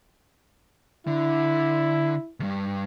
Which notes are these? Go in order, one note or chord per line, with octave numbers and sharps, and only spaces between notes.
D3 E4
D2 G2